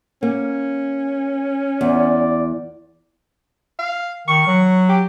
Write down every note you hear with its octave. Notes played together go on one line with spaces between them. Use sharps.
A#3 C#4
E2 D5
F5
D#3 C#6
F#3
G4